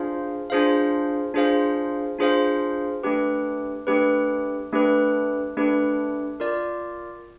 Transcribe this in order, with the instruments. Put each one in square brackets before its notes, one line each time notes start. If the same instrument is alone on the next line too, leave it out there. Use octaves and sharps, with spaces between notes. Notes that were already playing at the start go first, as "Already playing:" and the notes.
Already playing: [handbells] D4 F4 G#4 C5 F5
D4 F4 G#4 C5 F5
D4 F4 G#4 C5 F5
D4 F4 G#4 C5 F5
A3 D4 G4 B4
A3 D4 G4 B4
A3 D4 G4 B4
A3 D4 G4 B4
F4 A#4 D5